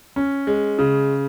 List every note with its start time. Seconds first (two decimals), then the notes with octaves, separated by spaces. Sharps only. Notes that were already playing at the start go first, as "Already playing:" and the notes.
0.16 C#4
0.47 G#3
0.79 C#3